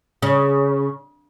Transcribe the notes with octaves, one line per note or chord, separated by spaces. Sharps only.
C#3